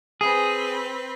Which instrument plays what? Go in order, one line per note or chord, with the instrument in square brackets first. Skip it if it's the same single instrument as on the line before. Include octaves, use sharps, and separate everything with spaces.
[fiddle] C4 B4 [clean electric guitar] G#4